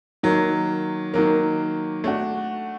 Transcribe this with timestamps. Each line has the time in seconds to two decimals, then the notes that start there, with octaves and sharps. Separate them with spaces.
0.23 D#3 F#3 A#3
1.14 D#3 F#3 A#3
2.04 A3 D4 F#4